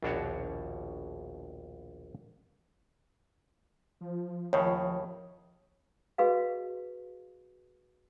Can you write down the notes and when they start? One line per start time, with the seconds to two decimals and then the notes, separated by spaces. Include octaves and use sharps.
0.02 A#1 D#2 B2 D4 F#4 C#5
4.01 F3
4.53 D#2 A2 C#3 C#5
6.18 F#4 G#4 B4 D#5 F5